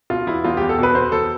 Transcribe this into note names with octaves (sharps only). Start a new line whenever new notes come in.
B2 F4
E2 E4
E2 F4
E2 G4
A4
B2 B4
B2 C5
E2 A4